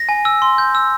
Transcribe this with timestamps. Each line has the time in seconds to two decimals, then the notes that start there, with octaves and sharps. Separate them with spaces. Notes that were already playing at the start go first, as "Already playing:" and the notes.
Already playing: A#6
0.09 G#5
0.25 E6
0.42 C6
0.58 G6
0.75 E6